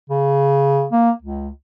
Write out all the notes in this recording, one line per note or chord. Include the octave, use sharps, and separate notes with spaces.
C#3
A#3
C#2